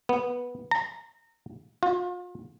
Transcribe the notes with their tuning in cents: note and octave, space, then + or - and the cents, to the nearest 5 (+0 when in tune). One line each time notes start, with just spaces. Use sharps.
B3 -10
A#5 -25
F4 +40